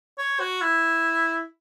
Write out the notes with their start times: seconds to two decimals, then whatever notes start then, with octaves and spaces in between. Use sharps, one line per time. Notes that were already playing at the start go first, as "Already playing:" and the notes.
0.18 C#5
0.40 F#4
0.61 E4